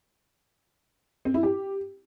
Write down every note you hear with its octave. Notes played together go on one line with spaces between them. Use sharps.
C4
E4
G4